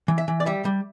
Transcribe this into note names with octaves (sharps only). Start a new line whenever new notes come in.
E3
E5
E3
D5
G3 E5
G3